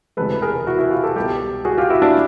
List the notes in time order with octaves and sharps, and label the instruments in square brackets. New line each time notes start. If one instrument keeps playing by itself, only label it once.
[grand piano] E1 D2 C3 E3 G#3 A4 B4
G#4 A#4
E4 F#4
E4 F#4
F4 G4
G4 A4
C2 B2 G3 G4 A4
F#4 G#4
F4 G4
E4 F#4
D4 E4